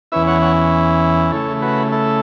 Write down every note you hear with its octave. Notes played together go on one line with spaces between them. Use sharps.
E2 E3 C#4 E4 B4 E5
C#5 F#5
C#5 F#5
C#3 A3 E4 A4 C#5
F#4 B4
E4 A4